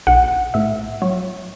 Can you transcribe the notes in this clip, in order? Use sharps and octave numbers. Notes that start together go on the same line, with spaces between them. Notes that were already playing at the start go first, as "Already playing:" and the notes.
B1 F#5
A2 E5
F#3 C#5